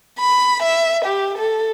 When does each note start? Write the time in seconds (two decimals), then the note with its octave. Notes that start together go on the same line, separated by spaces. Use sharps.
0.20 B5
0.62 E5
1.05 G4
1.38 A4